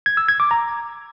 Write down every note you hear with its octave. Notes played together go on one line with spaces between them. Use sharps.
G#6
E6
G#6
D6
A#5